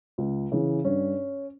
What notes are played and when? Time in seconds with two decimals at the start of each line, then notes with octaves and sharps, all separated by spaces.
0.18 C#2
0.52 C#3 E3
0.85 G2 C#4